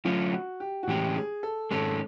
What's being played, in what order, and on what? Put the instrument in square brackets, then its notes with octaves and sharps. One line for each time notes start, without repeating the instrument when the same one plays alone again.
[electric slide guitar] D3 F#3 A3 C#4 [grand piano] F4
[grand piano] F#4
G4
F#4
[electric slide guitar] A2 E3 G#3 C#4 [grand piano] G4
[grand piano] G#4
A4
[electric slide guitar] G#2 D#3 G#3 C#4 [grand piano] A4